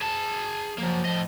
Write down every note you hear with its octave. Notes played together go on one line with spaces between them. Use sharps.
G#4 A5
F3 F#3 A#3
A2 D#5